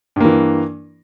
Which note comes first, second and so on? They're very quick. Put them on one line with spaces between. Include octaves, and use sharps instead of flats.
G2 A#3 E3